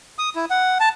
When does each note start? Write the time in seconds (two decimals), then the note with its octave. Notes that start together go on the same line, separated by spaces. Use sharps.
0.18 D#6
0.36 E4
0.50 F#5
0.80 A5